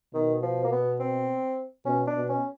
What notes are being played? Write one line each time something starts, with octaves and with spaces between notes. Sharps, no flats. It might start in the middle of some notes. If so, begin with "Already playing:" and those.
B2 D#3
F3
A#3
B3
C4
B2 C#4
D4
B2
C#4